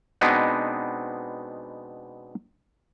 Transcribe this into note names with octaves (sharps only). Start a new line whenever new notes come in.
B2 G#3 B3 C4 D4 D#4